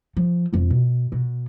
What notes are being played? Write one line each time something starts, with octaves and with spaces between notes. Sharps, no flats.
F3
E1 F2
B2
B2